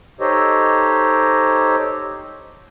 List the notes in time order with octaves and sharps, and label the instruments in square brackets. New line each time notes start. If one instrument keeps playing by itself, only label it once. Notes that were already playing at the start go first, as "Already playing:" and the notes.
[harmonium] D#4 G4 A4 C5 C#5 D#5